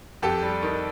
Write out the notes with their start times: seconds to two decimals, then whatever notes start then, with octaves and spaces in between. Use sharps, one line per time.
0.22 F2 G4 A4
0.43 G3
0.63 D#3